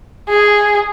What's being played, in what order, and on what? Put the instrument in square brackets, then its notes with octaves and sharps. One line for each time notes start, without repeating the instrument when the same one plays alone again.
[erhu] G#4